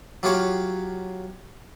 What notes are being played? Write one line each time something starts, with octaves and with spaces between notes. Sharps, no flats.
F#3 F4 G4 C#5 F5